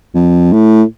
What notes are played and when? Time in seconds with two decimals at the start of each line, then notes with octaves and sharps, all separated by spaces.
0.15 F2
0.53 A2